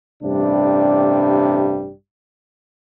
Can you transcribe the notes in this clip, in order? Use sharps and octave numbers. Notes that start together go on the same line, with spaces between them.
A1 G2 C3 G3 D4